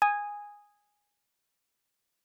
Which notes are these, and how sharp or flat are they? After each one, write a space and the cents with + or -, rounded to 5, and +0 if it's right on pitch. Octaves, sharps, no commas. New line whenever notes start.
G#5 -10 D#6 +0